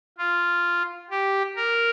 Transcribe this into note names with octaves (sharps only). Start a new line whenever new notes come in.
F4
G4
A#4